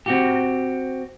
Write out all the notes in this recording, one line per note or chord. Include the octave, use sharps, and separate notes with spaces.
C4 F#4 G4